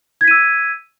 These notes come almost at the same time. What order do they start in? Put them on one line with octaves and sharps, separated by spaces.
G#6 B6 D#7 E6